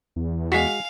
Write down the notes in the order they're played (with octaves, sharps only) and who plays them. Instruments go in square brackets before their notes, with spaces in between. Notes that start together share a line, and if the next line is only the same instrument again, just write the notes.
[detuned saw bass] E2
[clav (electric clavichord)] G#3 F#4 [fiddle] F5 [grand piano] G#5 B6 C7